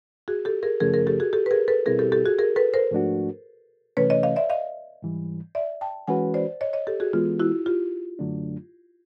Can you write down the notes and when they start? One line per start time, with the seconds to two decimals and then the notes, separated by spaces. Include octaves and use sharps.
0.28 F#4 G#4
0.45 G4 A4
0.63 G#4 A#4
0.80 F#2 C#3 F3 A3 C#4 G#4 A#4
0.94 G#4 A#4
1.07 G4 A4
1.20 F#4 G#4
1.33 G4 A4
1.46 B4
1.51 G#4 A#4
1.68 A4 B4
1.86 B2 G3 C4 E4 G#4 A#4
1.99 G4 A4
2.12 G4 A4
2.26 F#4 G#4
2.39 G#4 A#4
2.56 A4 B4
2.74 A#4 C5
2.91 G#2 F3 A3 D4 F#4
3.97 C3 E3 A3 C#4 B4 C#5
4.10 C#5 D#5
4.23 D#5 F5
4.36 D5 E5
4.50 D#5 F5
5.03 G#2 E3 G3
5.55 D5 E5
5.81 G5 A5
6.08 E3 G#3 C#4 F#4 B4 F#5 G#5
6.34 C5 D5
6.61 C#5 D#5
6.73 C#5 D#5
6.87 G4 A4
7.00 F#4 G#4
7.13 E3 G#3 B3 F4
7.40 E4 F#4
7.66 F4 G4
8.19 F#2 D3 F#3 A3 D4